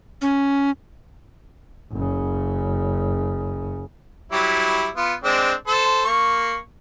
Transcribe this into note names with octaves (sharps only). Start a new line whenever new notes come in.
C#4
F#1 C#3
F#3 G3 E4
B3 F4
G#3 C4 D4
A4 C5
A#3 C#6